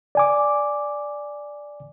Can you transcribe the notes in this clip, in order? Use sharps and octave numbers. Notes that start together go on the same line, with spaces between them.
D5 G#5 D6